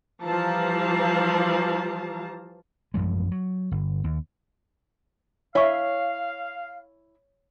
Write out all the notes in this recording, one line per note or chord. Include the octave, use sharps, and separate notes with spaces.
E3 F3 G3 F5 A5 A#5
A1 F#2 F3 G#3
F#3
G1
D#2
E4 C#5 E5 F5 G#5 C#6